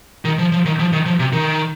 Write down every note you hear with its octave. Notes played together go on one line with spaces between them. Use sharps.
D#3
F3
F3
D#3
F3
D#3
F3
C3
D#3